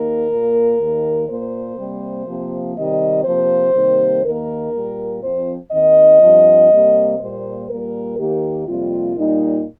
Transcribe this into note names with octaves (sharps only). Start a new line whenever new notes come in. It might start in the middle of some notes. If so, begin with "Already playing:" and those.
Already playing: D#2 D#3 A#3 A#4
A#2 A#3
D#2 D#3 A#3
A#2 A#3 C5
C3 G3 A#3
C3 F3 A#3
C3 D#3 G3 D#5
C3 F3 A#3 C5
C3 D#3 G3 A#3
D#2 D#3 A#3 A#4
A#2 G3 A#3
F2 F3 C4 C5
D#2 D#3 C4 D#5
G2 F3 C4
C3 G3 A#3
A#2 G3 A#3 C5
A#2 G3 A#3 A#4
D#2 D#3 A#3 G4
F2 C3 G3 A#3 F4
A#2 G3 A#3 D#4